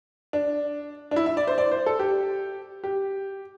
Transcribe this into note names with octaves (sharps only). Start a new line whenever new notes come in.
D4
D4
E4
E5
D5
C5
D5
C5
A4
G4
G4